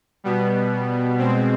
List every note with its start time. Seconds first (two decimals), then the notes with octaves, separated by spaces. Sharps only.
0.24 B2 G3 B3
1.19 B2 G#3 C4